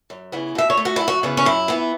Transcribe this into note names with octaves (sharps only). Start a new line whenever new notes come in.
F#2
C#3 E3 B3
B2 E5
C#5
A3
F#4
F#2 E4
F#4
C#3 E3 B3
C#4
F#2 E4
E3 B3